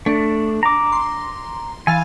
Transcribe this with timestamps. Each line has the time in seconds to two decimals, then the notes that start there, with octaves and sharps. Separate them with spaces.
0.06 A3 D4
0.63 A#5 D6
0.92 C6
1.87 E3 F5 G#5 A6